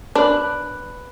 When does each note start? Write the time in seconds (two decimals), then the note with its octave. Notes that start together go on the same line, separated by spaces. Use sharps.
0.15 D4 B4 F#6